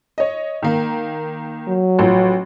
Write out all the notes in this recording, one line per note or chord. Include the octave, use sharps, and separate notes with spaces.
C#5 D#5
D#3 A#3
F#3
A1 F3